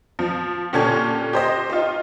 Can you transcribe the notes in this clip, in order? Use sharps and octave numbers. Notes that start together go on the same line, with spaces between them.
F3
A#2 D3 C#4 G4 A5 G#6
G4 C5 D#5
D#4 F4